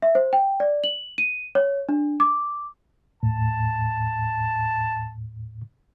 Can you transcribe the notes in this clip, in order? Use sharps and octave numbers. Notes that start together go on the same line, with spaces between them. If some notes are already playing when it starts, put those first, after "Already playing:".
E5
C5
G5
D5
F#7
D#7
C#5
D4
D6
D#2 A2 A5